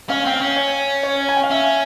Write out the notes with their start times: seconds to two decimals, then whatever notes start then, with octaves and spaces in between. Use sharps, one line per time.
0.09 C#4 F5
0.25 C4 G5
0.33 F5
0.41 C#4
0.56 C#5
1.03 C#5
1.29 G#5
1.37 G5
1.43 F5
1.50 C#4 E5